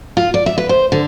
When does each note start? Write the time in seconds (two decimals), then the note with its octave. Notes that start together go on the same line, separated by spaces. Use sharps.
0.17 F4
0.34 D5
0.46 E5
0.58 B4
0.69 C5
0.92 D3